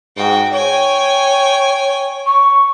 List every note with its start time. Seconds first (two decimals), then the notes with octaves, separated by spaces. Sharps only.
0.17 G#2 F#4 G5
0.53 C#5 G5 G#5
2.26 C#6